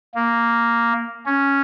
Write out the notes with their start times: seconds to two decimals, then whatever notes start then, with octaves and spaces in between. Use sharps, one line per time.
0.15 A#3
1.26 C#4